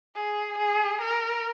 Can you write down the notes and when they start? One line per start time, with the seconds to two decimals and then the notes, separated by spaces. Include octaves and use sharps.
0.15 G#4
0.58 G#4
1.01 A#4